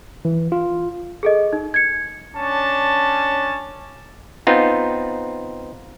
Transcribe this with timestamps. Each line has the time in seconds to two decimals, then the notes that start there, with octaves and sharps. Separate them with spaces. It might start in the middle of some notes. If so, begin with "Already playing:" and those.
0.25 E3
0.52 F4
1.23 G#4 A4 D#5
1.53 D#4
1.74 G#6 C#7
2.37 C#4 D4 A5
4.47 B3 C4 D#4 F4